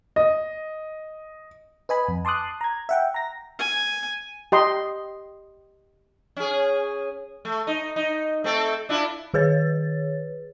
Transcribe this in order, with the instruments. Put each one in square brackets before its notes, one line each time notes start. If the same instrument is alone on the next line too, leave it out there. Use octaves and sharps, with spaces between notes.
[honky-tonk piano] D#5
[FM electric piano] B4 D#5 G#5 B5
F2
A5 C6 D6 D#6 F#6
A#5 G#6
E5 F#5 G5
A#5 A#6
[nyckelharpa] G#5
[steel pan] G4 D#5 C6
[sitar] C#4 G#4
A3
D#4
D#4
A3 C4 A4
D4 E4 F4
[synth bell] D#3 G#4 B4 C#5 A6